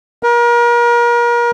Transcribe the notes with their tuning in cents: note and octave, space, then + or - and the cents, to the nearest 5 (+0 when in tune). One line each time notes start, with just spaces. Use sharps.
A#4 +35